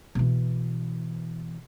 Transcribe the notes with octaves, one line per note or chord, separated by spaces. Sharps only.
B2 E3